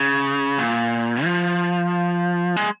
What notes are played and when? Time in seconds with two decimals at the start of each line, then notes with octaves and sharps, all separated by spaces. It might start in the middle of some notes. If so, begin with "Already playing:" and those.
Already playing: C#3
0.59 A#2
1.24 F3
2.56 G#3